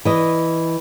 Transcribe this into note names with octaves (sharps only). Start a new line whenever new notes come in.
E3 D#5